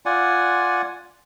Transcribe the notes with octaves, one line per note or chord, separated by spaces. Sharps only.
F4 D5 F#5 G#5